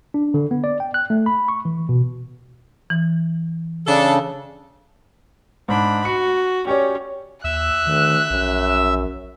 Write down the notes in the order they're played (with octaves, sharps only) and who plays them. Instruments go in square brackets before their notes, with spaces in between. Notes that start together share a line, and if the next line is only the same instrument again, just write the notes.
[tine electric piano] D4
D3
B3
D5
G5
F#6
A3
B5
C#6
E3
B2
[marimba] E3
[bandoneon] C#3 [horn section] D4 A4
[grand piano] G#2 [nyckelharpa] D4 B5
[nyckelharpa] F#4 [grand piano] C#7
[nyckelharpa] C#4 [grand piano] G4 C#5 D5
[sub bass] D#2 [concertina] E5 E6 [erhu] F#6
[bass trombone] D2 [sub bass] D#3
[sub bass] A#1 [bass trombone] F#2